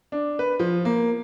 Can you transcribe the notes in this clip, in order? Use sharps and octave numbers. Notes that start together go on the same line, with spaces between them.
D4
B4
F3
A#3